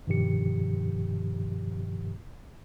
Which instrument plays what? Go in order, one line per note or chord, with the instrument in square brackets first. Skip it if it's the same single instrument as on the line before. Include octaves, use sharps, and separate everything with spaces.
[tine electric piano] G2 B2 D#3 F3 G4 C#7